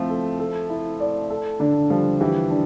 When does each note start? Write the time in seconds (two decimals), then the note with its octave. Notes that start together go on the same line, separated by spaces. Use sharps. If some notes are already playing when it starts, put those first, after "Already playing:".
Already playing: F3 A3 C4 E4
0.10 A4
0.39 A4
0.70 E4
1.00 D5
1.30 A4
1.60 D3 D4
1.90 F3 G3
2.21 E3 G4
2.51 D4